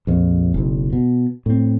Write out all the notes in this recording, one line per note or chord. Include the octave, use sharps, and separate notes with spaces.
A#1 F2
F#1 B1
B2
A2 C4